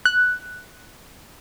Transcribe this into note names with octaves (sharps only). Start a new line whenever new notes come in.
F#6